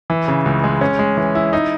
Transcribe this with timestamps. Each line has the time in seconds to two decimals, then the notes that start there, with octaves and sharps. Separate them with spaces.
0.10 E3
0.28 C#3
0.45 C#2
0.64 G#3
0.81 C#4
0.99 G#3
1.17 E3
1.35 E4
1.53 D#4